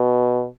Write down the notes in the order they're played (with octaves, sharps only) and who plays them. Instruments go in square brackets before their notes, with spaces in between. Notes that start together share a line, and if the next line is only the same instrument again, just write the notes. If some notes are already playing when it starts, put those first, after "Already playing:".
Already playing: [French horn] B2